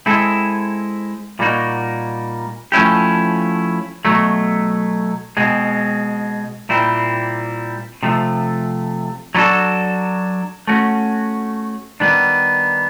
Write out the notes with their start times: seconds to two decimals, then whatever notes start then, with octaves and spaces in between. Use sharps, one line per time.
0.06 G#3 C4 E4 A4
1.39 A#2 G3 A#3 D#4 F#4
2.72 F3 A3 C#4 E4 G4
4.05 B2 F#3 A3
5.37 B2 G#3 C4
6.69 A#2 G3 C4 E4
8.03 C3 F3 A3
9.35 F#3 B3 D4 F#4 A4
10.68 A3 C#4 F#4
12.00 D#3 G3 B3 D4